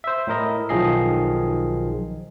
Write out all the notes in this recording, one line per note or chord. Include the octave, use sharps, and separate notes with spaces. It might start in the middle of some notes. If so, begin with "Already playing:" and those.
C5 E5
A2 E4 A#4 D#5
B1 D#3 F3 G#4 D#5 C7